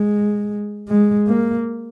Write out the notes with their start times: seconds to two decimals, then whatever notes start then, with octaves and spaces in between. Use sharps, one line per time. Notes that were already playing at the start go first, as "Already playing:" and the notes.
Already playing: G#3
0.88 G#3
1.28 A#3